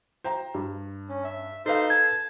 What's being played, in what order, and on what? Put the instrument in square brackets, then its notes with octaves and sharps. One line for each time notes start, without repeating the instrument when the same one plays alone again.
[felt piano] C5 G5 A#5
G2
[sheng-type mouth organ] C#4
E5
[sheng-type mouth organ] D#4 C5 C6 [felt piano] A4 B4 F5
[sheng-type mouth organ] A5 [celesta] G#6